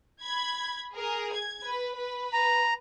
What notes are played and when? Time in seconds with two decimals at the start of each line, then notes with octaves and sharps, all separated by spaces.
0.22 B5 G#6
0.94 G#4 A#4
1.33 G#6
1.64 B4
1.97 B4
2.33 A#5